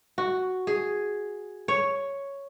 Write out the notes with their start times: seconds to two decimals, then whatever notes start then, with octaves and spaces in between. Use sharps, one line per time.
0.18 F#4
0.67 G#4
1.68 C#5